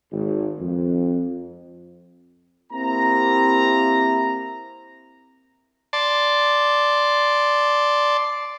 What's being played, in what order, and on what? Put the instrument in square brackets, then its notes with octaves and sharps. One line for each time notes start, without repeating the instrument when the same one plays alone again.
[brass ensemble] G#1
F2
A#3 C4 E4 G4 A#5
[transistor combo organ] D5 A5 C6